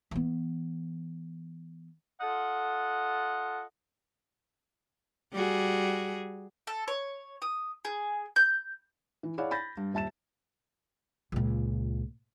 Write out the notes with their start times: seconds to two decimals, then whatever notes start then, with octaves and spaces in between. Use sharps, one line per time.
0.11 E3 B3
2.21 F4 A4 D#5 F#5
5.33 G3 F#4 G#4
6.67 A4
6.88 C#5
7.42 D#6
7.85 G#4
8.36 G6
9.23 E3
9.38 E4 G#4 C#5 D5 F5 F#5
9.51 B5 G6 A6 A#6
9.77 G2
9.94 D#1 E5 A5 A6 E7
11.32 C#2 A#2